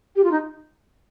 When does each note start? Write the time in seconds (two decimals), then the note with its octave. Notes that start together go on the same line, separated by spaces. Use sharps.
0.16 G4
0.23 F4
0.31 D#4